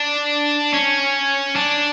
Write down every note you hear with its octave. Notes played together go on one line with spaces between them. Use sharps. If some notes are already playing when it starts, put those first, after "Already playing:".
Already playing: D4
C#4
D4